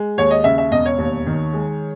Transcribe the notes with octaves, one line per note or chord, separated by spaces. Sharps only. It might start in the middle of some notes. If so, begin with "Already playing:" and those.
Already playing: G#3
D#2 C#5
D#5
C#3 E5
E5
E1 D#5
C#5
D#2
D#3
G#3